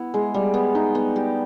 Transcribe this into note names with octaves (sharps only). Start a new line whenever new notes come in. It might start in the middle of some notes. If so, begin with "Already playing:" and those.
Already playing: B3 E4
G#3
G3
B3
D#4
B3
G4